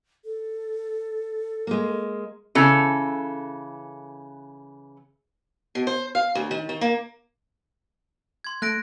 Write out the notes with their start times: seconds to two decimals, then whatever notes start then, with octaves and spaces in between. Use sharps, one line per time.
0.25 A4
1.67 G#3 A#3
2.55 C#3 E3 A4
5.75 B2
5.87 C5
6.15 F5
6.35 D2
6.51 D#3
6.69 D#3
6.81 A#3
8.44 C6 G#6
8.62 A3 F#6 A#6 D7